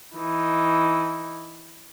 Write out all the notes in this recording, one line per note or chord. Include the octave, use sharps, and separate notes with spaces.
E3 D#4